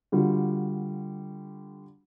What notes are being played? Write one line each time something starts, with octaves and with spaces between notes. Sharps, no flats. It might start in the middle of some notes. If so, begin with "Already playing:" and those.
D3 G3 F4 F#4